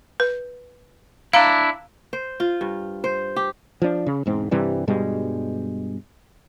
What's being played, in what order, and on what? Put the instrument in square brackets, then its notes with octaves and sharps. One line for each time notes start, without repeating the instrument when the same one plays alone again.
[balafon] B4
[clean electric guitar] D4 E4 [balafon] F5 A#5
[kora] C5
F4
G2
C5
G4
[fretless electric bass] F3 D4
C#3
E1 G#2 C4
G2 C3 E3 G3
G2 B2 G3 G#3